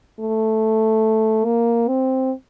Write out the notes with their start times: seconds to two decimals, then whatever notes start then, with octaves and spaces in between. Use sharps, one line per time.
0.20 A3
1.45 A#3
1.88 C4